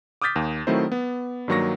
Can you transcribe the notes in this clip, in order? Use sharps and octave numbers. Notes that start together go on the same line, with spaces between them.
D6 D#6 F6 G6 A6 B6
D#2
D#3 F#3 A3 C4 E4 C5
B3
G2 D#3 F#3 A#3 C#6 A#6